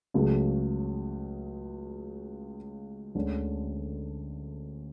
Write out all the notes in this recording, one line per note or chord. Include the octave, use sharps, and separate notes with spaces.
C#2 C#3 F#3 A3
D2 D3 G#3 C#4